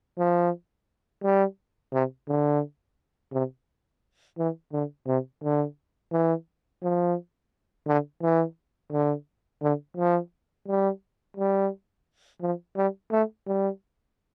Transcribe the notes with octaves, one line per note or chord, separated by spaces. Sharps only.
F3
G3
C3
D3
C3
E3
D3
C3
D3
E3
F3
D3
E3
D3
D3
F3
G3
G3
F3
G3
A3
G3